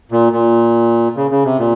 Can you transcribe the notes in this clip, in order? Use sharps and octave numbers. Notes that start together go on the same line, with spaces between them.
A#2
A#2
C#3
C#3
C3
A#2